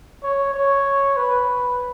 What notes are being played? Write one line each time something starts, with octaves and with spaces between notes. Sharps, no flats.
C#5
C#5
B4